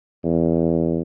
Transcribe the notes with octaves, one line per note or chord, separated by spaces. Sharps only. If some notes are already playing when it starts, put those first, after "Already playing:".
E2